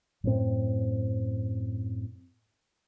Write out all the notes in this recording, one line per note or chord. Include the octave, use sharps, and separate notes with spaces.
F#2 A2 C4